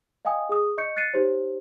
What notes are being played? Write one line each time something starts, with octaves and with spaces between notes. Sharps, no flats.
D#5 F5 G5 G#5 D#6
G#4 D#6
D#5 C#6 G6 C#7
F#6 A6 C7 C#7 D#7
D#4 G4 C5 C#5